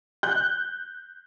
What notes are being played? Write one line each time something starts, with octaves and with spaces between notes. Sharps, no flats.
F#6 G6